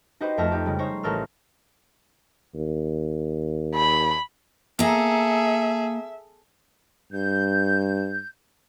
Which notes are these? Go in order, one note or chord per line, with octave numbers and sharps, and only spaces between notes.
D#4 F#4 G4 B4 C5 D#5
F2 A3 E5 A#5 F6 E7
D#4 G4
C#3 G3 G#3
D#4 C5 C#5 A#5
A1 A4 A#4 E6 F6
D#2
B5
A#3 G#4 A4 E5 A#5
G2 G6